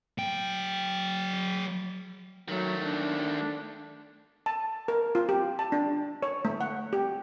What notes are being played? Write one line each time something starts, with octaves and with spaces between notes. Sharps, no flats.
F#3 G5
D#3 F#3 A3
D4
A5
A#4
F4
G4
A5
D4
C#5
A3
F#5
G4